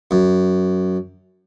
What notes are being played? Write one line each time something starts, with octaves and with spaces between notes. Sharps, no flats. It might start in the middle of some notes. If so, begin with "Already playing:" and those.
F#2